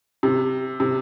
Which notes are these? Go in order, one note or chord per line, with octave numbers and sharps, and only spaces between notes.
C3
C3